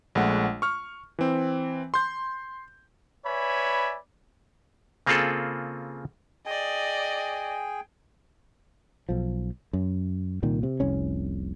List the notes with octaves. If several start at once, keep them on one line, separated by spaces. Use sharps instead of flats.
A#1 G#3 A3 F#5
C#6 F6
E3 C4
C6 G6
B4 C#5 D5 E5 G#5 B5
C#3 A#3 C4 F4 G#4 A4
G#4 D5 D#5 G5 G#5
B1 F3
F#2
C2 A#2 D#3
C3
F1 C2 C#4